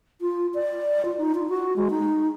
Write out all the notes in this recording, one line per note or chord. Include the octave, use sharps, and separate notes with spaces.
F4
D5
F4
D#4
F4
F#4
G#3
D#4